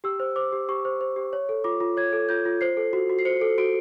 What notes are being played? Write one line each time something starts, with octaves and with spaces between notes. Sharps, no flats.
G4 E6
C5
C5 D6
G4
G4 C#6
C5
C5
G4
C#5
A4
F4 D6
F4
C#5 G#6
A4
F4 G6
F4
C5 C7
A4
F#4
F#4
C7
C5 C#7
A4
F#4 D7